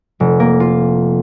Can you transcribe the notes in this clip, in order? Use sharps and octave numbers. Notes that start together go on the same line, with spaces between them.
F1
A#3
F4